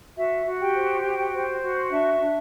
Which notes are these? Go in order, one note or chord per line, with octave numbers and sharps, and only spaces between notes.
F#4 E5
F#4
G4 G5
C5
F#4
C5
F#4
D4 E5
D4